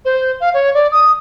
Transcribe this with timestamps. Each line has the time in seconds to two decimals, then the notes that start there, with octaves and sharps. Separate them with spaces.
0.05 C5
0.40 F5
0.54 C#5
0.74 D5
0.92 D#6